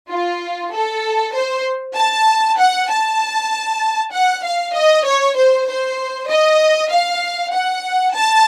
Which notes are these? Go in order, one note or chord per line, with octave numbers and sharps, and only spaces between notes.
F4
A4
C5
A5
F#5
A5
F#5
F5
D#5
C#5
C5
C5
D#5
F5
F#5
A5